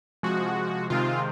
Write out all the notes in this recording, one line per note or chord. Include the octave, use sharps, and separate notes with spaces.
C3 F3 G#3 F#4
C3 D#3 G#3 C4 F4